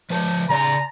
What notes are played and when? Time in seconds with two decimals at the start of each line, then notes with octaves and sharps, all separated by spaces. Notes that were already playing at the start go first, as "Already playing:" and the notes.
0.10 F3 B4 A5
0.49 C#3 D5 A#5